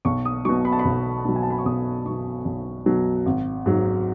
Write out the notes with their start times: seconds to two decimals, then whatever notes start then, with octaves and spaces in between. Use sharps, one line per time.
0.05 B1 C#6
0.25 D#6
0.45 B2 F#3 C#6
0.65 B5
0.72 A5
0.79 B5
0.85 B1
1.25 B2 F#3
1.36 G#5
1.43 A5
1.50 B5
1.58 C#6
1.65 B1 D#6
2.06 B2 F#3 C#6
2.45 B1
2.86 B2 F#3
3.26 G#1
3.66 G#2 F#3